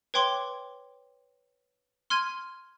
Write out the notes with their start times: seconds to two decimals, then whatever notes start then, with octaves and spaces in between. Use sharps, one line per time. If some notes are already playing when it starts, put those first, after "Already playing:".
0.14 B4 C#5 G5 C6 D6 G7
2.10 C6 F6 G#6 D#7